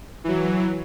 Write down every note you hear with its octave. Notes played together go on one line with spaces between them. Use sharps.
E3 F#3